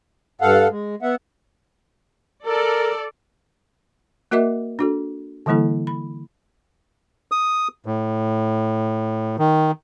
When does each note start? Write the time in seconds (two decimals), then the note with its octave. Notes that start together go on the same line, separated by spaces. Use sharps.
0.41 G2 A4 F5 F#5
0.71 G#3
1.02 B3 E5 F#5
2.46 A4 A#4 D5
4.31 A#3 F#4 A#4 D#5 E5 D6
4.79 D4 F#4 A4
5.46 D3 E3 G3 A#3 E4 A4
5.87 B5
7.32 D#6
7.86 A2
9.39 D#3